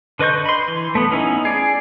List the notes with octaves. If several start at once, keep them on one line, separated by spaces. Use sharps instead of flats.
D3 B4 D#5 C#6 G6
B5 C6
E3
A3 B3
B3 C#4 D#4 E4
G#4 D5